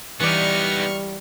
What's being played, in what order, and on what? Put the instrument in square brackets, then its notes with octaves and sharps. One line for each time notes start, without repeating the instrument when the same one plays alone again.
[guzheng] E3 D5 [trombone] G3 [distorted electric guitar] B3 D#4 [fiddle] C#6 F6